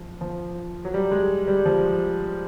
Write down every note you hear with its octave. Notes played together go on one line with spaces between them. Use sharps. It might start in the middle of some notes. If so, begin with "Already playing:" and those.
Already playing: F3
F3
F#3
G3
G#3
G3
F3